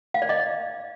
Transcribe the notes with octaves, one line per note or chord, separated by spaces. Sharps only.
F5
D5
D#5